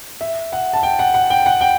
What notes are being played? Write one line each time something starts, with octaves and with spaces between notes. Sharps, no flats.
E5
F#5
A5
G5
F#5
F#5
G5
F#5
G5